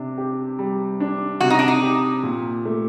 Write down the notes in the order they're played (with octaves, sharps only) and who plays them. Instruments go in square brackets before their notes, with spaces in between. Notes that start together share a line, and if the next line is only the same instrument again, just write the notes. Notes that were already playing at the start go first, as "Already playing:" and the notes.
Already playing: [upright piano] C3 D4
G4
G3
D4
[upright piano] C3 [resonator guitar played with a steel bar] F#4
[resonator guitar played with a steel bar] D#4
D4
D#4
[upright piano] G4
A#2
A3